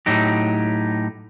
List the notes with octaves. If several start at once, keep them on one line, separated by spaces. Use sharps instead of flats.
A2 F#3 D#4 G4